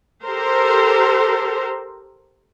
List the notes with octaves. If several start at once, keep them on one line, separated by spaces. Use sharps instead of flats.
G4 A4 A#4 C5